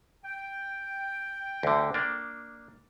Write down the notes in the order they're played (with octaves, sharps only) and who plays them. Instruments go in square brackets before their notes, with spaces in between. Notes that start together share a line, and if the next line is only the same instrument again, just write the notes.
[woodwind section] G5
[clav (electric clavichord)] D2 D3
A#3 D4